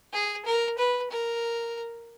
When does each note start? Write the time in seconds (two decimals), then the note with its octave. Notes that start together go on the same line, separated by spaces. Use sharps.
0.13 G#4
0.46 A#4
0.78 B4
1.11 A#4